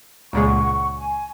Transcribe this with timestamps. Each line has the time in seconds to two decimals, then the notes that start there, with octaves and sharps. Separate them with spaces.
0.33 C#2 A#2 G#3 F#5 C#6
0.97 G#5